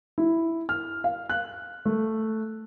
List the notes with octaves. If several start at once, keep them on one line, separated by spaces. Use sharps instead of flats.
E4
F6
F5
F#6
A3